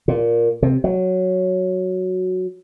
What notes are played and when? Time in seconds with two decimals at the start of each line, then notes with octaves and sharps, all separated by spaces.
0.08 A#2
0.62 C3
0.84 F#3